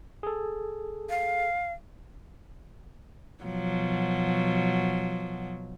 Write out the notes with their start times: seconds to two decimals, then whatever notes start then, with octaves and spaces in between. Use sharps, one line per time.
0.23 G#4 A4
1.10 F5
3.44 B2 F3 F#3